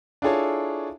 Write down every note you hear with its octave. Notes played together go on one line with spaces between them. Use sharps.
D4 E4 F4 G#4 A4 C#5